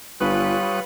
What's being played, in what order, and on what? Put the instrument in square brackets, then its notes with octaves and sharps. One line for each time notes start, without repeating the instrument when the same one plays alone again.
[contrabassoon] G1 [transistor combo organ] G3 C#5 D#6 [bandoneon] F4 F#6 [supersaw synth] B4